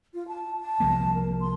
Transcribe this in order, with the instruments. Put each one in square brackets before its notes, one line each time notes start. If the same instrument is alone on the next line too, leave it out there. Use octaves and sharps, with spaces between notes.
[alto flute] F4
A5
A5
[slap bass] C2 F3 A#3
[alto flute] A#4
C6